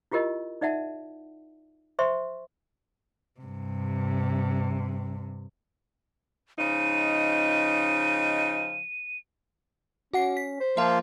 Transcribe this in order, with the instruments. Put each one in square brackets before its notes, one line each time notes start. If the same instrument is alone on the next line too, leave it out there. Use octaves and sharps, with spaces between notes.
[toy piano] E4 F4 G4 A#4 D#5
D#4 D5 E5 F#5 A5
C5 E5 C6 C#6
[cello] G2 C3
[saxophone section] C#3 F3 D#4 [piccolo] D#7
[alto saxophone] C#4 [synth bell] F#4 F#5 C7
[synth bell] B6
[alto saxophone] C5
[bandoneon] F3 A#3 F4 [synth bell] E5 A5